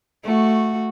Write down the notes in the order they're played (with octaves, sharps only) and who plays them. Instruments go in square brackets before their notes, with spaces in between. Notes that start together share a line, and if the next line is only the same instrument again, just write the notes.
[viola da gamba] A3 F#4